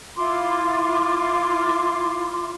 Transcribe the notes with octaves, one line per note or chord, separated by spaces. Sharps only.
E4 F4 C6 D6